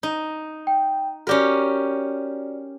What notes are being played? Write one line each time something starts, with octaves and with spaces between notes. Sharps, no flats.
D#4
G5
C#4 F#4 G4 A#4 D5